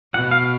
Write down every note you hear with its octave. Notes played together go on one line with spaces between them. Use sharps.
B2 F#5
F5